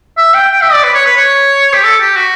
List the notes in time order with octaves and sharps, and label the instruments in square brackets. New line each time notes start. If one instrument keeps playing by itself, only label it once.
[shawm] E5
G5
G5
E5
D5
B4
C#5
B4
C#5
G4
A4
G4
F#4